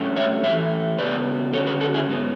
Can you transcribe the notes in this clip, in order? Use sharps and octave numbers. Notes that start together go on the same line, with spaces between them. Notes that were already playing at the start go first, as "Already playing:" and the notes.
Already playing: A2 F#3 A3 C#4
C#5 E5
A2 E3 A3 C#5 E5
C#3 F#3 B3 B4 D5
D3 F#3 C#4 A4 C#5
G#4 B4
F#4 A4
E4 G#4
G#2 F#3 B3